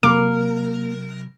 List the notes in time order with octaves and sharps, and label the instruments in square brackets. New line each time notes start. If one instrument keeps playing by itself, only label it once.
[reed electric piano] C3 F#3 [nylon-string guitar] A#3 [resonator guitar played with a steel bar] A#4 [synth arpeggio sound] D6